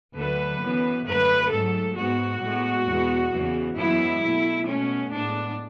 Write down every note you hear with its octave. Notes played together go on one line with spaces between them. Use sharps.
D2 D3 F#3 A3 B4
F#2 E3 B3
F#2 D3 A3 B4
G#2 F#3 A3 A4
G#2 G#3 B3 F#4
A2 G#3 B3
E2 B2 G#3 B3
E2 C#3 E3 B3
F#2 E3 G#3 B3 E4
B2 A3
B2 A3 C#4
A2 G#3 B3 D4